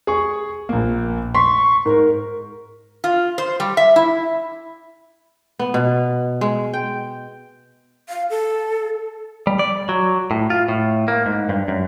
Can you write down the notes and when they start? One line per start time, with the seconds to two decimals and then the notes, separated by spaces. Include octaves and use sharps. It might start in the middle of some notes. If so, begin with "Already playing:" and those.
0.07 G#4 C#6
0.69 A#1 A#3
1.35 C6 C#6 B6
1.86 G#2 A#4
3.04 F4
3.38 C5
3.60 G3
3.77 E5
3.96 E4
5.59 B3
5.74 B2
6.41 G#3
6.73 G5
8.09 F5
8.30 A4
9.47 G3
9.59 D5
9.89 F#3
10.31 A2
10.50 F4
10.68 A2
11.08 A#3
11.26 G#2
11.49 G2
11.68 F#2